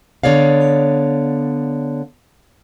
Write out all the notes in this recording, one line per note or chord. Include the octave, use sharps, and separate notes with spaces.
D3 B3 C#5 D5 F5